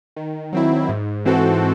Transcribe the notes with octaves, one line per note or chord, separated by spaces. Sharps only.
D#3
F#3 C4 E4
G#2
E3 C4 F#4 A4